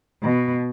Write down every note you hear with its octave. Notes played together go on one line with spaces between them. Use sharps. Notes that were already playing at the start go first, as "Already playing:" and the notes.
B2